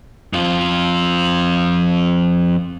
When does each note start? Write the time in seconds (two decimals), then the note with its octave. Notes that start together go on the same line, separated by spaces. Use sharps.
0.33 F2 F4